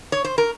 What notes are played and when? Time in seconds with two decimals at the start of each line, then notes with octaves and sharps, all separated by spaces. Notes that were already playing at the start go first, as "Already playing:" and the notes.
0.12 C#5
0.24 C5
0.38 A#4